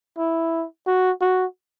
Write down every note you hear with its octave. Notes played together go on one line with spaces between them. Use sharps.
E4
F#4
F#4